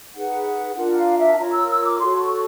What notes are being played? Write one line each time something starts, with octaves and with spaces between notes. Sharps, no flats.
D#4 G#4 B4 F#5
D4 F4 A#4 F#5
F5
E5
A5
F4 A#4 C#5 A#5
E6
E6
D6
F#4 A4 C#5 C6
C#6